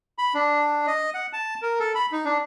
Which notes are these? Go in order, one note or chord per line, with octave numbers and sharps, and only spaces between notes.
B5
D4
D#5
F#5
A5
A#4
A4
B5
D#4
D4